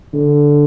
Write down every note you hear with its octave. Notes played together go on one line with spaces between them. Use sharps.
D3